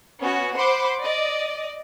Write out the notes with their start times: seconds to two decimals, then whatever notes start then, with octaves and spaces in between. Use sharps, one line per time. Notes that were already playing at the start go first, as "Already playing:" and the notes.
0.22 B3 C#4 F#4
0.56 C5 F#5 B5 C6 D6
1.00 D5 D#5